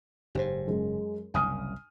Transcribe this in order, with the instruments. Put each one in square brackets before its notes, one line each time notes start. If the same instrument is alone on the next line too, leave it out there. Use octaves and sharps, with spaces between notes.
[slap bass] F#1 G#2 [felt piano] G4 C5
[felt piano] F#2 G#3
[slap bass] F#1 C2 F#2 [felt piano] G#5 D#6 F6